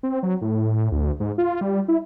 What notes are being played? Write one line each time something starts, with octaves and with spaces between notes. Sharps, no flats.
C4
F#3
A2
D2
G#2
F4
G3
E4